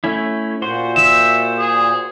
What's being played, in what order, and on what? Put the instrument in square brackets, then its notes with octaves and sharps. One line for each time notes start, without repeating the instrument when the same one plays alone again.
[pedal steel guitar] A3 C#4 E4
[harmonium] A#2 C5 [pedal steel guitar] F#4 C6
[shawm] E5 [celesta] E7
[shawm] G#4